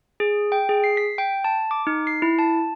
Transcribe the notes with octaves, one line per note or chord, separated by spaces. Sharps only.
G#4
G5
G#4
C7
B6
G5
A5
D6
D#4
C7
E4
A5